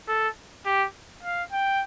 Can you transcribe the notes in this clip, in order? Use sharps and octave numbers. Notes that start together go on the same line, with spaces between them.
A4
G4
F5
G5